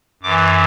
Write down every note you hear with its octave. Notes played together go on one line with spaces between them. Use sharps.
F#2 E3 D6